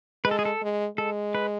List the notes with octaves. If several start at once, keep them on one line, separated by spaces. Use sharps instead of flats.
G#3 B4
A4
G#4
A4
G#3
G#3 A4
B4